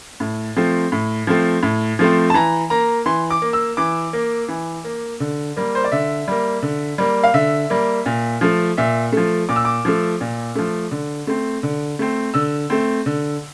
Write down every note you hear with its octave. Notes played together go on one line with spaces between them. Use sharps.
A2
F3 A3 C4
A2
F3 A3 C4
A2
F3 A3 C4
A5
E3 A#5
A#3 A#5
E3 C6
D6
A#3
E6
E3 D6
A#3
E3
A#3
D3
G3 A#3
C5
D5
D3 E5
G3 A#3
D3
G3 A#3
F5
D3 E5
G3 A#3
A#2
F3 A3
A#2 E5
F3 A3
A#2 D6
E6
D6
F3 A3
A#2
F3 A3
D3
A3 C4
D3
A3 C4
D3 E6
A3 C4
D3